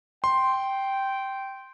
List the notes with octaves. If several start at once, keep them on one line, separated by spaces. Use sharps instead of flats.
G5 C6